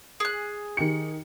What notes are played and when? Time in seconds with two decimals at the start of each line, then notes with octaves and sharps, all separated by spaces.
0.20 G#4 F#6
0.77 D#3 G4 C#7